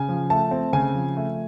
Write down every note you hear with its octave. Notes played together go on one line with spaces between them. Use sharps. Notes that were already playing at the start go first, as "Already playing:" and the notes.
Already playing: C#3 G#5
F3
A3 A5
C4
C#3 G#5
F3
A3